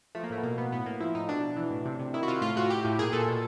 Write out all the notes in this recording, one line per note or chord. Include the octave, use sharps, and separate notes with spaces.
F3 A3
A#3
A2 A3
B3
B2 A#3
B2 B3
A2 B3
A2 A#3
F3 E4
A2 D#4
B2 D4
B2
E3
A2
C3
C3
D#3 E4
F#4
C3 F4
A2 F4
A2 F#4
A2 G4
A2
A#2 G#4
A#2 A4
B2